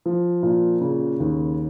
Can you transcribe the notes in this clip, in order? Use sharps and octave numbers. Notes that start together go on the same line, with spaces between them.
F3
A#2
C#3
D#2